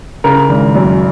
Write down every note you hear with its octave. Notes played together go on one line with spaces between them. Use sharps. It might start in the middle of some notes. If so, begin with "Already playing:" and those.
C#3 A#4
G#1
F#2